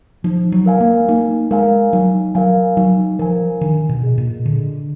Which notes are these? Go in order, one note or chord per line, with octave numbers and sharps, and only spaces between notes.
F3 D#4
F#3
A#4 F5 G#5
A#3
A#3 D#4
G#3 A#4 F5 G#5
F#3 D#4
F#3 A#4 F5 G#5
F#3 D#4
F3 A#4 F5 G#5
D#3 D4
B2
G#4 D#5
A#2
D3 D4